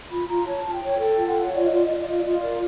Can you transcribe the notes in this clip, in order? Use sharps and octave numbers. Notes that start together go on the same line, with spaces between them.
F4 B5
F4 A#5
C#5 A5
F4
G5
C#5
A4 G5
F4
F#5
C#5
F4 D5
D#5
F4 D5
F4 D#5
D5
F4 D#5
D5
F4 D#5
A#4 D5